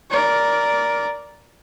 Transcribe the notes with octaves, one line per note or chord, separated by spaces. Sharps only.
A#4 D5